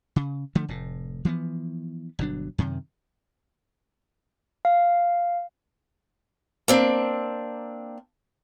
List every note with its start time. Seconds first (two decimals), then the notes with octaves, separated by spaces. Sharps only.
0.16 C#3
0.55 D3 F3 A3
0.68 F1 A2
1.25 E3 F3 A#3 B3
2.19 G1 B2 F#3 D4
2.58 F#2 C3 D#3
4.65 F5
6.68 A#3 C4 D4